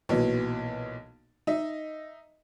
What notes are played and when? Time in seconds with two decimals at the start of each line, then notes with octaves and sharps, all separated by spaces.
0.09 B1 A#2 E3 F#3
1.47 D#4 D#5 E5